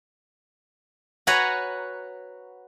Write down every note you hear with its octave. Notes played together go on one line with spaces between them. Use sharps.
F#4 B4 C#5 F#5 G#5 A#5